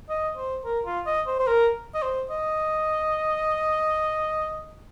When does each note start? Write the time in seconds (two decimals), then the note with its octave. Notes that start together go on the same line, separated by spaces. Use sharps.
0.09 D#5
0.37 C5
0.65 A#4
0.86 F4
1.06 D#5
1.27 C5
1.40 C5
1.47 A#4
1.95 D#5
2.02 C5
2.30 D#5